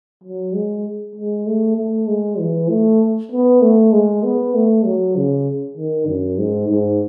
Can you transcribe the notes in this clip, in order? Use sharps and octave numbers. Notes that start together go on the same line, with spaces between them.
F#3
G#3
G#3
A3
A3
G#3
E3
A3
B3
A3
G#3
B3
A3
F#3
C#3
D#3
F#2
G#2
G#2